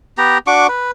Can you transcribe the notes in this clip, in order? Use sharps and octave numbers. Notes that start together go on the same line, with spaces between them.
B3 G4 A#5
D4 F#4 C#6 D6
B4